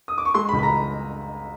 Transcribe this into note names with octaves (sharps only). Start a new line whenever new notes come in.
D#6
D6
C#6
G#3 C6
B5
C#2
B5
A#5